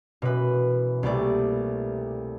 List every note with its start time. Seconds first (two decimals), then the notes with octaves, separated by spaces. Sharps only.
0.22 F#2 B2 E3 B4
1.03 C2 A#2 G3 A3 D5